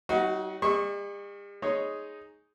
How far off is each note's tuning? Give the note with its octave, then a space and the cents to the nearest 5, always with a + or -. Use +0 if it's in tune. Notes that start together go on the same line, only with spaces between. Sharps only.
G3 -45 D#4 +35 F#4 -5
G3 +45 D#5 +25 C#6 -15
G#3 +0 D#4 +0 C#5 +0